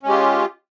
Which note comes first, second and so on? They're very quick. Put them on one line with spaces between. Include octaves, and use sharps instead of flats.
C#4 G#3 G4 F4